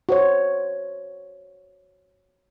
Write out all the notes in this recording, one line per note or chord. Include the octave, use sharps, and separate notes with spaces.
F#4 C5 C#5